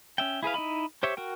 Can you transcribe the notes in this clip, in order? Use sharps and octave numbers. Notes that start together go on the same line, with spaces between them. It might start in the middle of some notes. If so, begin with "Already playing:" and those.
C#4 E5 G5
E4 G#4 B4 F5
D#4 E4 D#5 B5
G4 C5 C#5 E5
F#4 A#4 G5